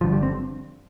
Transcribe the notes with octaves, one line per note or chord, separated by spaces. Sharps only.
G1 G2 D3 F3
G3
C4